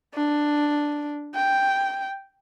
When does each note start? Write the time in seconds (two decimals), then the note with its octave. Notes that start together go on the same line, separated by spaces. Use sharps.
0.15 D4
1.35 G5